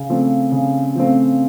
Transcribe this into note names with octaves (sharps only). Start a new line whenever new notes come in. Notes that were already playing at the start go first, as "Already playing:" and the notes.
Already playing: C#3
F3 A3 C4
C#3
F3 A3 C4